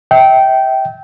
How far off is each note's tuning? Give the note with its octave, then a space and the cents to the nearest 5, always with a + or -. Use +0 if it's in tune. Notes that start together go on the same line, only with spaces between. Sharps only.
E5 -30 G5 -15